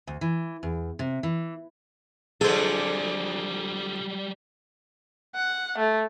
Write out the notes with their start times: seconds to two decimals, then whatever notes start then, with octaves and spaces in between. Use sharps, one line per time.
0.07 D2
0.21 E3
0.63 E2
0.99 C3
1.23 E3
2.41 F2 D3 F#3 G3 G#4 A4 C5
5.35 F#5
5.78 A3